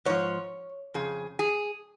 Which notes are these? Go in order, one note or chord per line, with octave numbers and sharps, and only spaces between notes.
G#2 F3 C#5
F2 C#3 G#4
G#4